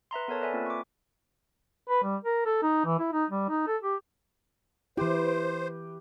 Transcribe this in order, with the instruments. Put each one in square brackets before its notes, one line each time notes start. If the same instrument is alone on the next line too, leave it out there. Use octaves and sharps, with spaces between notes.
[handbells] B4 E5 A#5 C6
B3 A4 A#4 C#5 A5
A4 B4 D5 E5 G#5 B5
A#3 C4 F4
C#6 D6
[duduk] B4
G3
A#4
A4
D#4
E3
E4
D#4
G3
D#4
A4
G4
[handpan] E3 E4 [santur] G4 B4 [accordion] C5